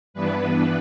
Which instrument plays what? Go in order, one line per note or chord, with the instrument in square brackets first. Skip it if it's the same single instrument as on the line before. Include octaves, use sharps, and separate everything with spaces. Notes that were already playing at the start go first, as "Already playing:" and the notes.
[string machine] G2 E3 B3 D4 B4